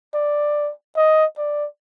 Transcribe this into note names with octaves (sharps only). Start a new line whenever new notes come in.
D5
D#5
D5